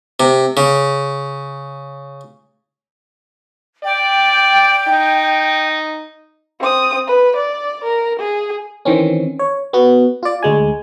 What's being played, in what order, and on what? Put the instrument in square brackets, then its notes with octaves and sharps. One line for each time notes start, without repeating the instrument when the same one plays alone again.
[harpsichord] C3
C#3
[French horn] D5 [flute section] G5
[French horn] D#4
[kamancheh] C4 D#6
B4
D5
A#4
G#4
[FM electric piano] D#3 E3 C4 C#4
C#5
B3 F#4
F4 D5
D2 G#3 G#5